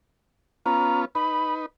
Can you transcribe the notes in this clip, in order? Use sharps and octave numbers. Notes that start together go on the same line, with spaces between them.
B3 C#4 F4 A#5
D#4 B4 B5